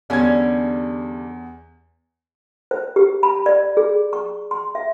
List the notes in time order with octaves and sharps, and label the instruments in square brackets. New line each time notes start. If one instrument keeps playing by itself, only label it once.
[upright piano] E2 G#6 [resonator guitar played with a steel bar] D3 G3 C#4
[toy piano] C5
G4
B5
D5
G#4
C#6
C6
E5